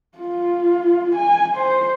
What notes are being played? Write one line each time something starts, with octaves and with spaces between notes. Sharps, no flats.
F4
G#5
C5